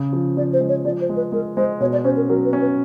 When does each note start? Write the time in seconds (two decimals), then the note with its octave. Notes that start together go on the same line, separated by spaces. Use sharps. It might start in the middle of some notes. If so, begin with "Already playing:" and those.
Already playing: C#3
0.13 F3
0.37 F3 D5
0.53 C5
0.60 G#3
0.69 C#5
0.85 F3 D5
1.01 C5
1.09 G#3
1.16 B4
1.32 G#3 A#4
1.57 G#3 C5
1.80 B2 C#5
1.93 D5
2.04 C#4 C5
2.17 A#4
2.29 F#3 A#4
2.45 B4
2.53 C#4
2.61 B4